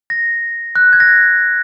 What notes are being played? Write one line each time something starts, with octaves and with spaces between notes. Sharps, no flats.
A#6
F#6
G#6
A#6